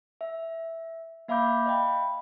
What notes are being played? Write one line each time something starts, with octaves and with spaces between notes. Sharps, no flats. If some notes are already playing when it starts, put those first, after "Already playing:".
E5
A#3 E5 F5 B5 D6 G6
D#5 F5 G5 B5